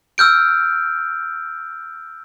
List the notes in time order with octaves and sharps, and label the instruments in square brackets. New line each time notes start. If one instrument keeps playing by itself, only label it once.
[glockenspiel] E6 F6 G6 D7